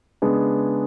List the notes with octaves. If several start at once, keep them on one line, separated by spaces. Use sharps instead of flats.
C#3 G#3 B3 D4 G#4